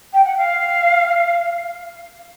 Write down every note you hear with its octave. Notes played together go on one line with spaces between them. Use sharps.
G5
F#5
F5